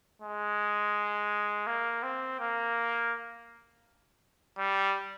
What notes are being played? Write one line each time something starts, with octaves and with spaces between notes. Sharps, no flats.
G#3
A#3
C4
A#3
G3